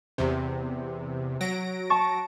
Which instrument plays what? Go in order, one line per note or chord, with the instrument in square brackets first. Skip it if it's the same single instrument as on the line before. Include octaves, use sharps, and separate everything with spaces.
[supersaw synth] E2 C3
F#3 A#6 D7
[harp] A5 C#6 A6